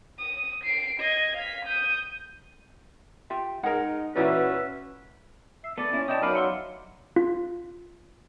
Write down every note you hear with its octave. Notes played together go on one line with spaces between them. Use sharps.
D#6
C7 D7
D#5 G#6
F5 B6
D#6 G6
F4 G4 E5
G#3 D#4 G#4 A#4 F#5
A#2 E3 B3 C#4 F#4 B4 D5 E5
E5 C7
B3 A4 D5
A#2 C#4 E4
B2 E4 D5 D#5 G5 A5 D#6
F#3 D#4 A#4 B4 F5 B5 D6 F6
E5 F#5 C6 C#7
F4